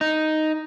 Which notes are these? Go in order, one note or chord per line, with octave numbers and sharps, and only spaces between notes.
D#4